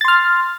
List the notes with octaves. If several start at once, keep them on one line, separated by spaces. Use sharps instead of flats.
C6 F6 A6